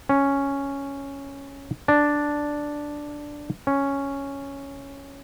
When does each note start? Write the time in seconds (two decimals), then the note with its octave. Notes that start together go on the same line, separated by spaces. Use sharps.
0.09 C#4
1.88 D4
3.67 C#4